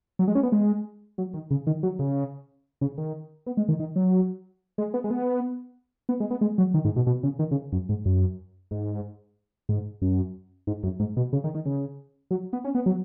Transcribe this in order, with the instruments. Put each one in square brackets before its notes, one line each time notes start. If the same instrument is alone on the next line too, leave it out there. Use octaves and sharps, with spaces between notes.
[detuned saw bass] F#3
G#3
C#4
B3
G#3
F#3
D#3
C#3
D#3
F#3
C#3
C#3
D#3
B3
G#3
D#3
D#3
F#3
G#3
B3
G#3
B3
B3
G#3
B3
G#3
F#3
D#3
G#2
B2
B2
C#3
D#3
C#3
F#2
G#2
F#2
G#2
G#2
F#2
G#2
F#2
G#2
B2
C#3
D#3
D#3
C#3
F#3
B3
C#4
B3
F#3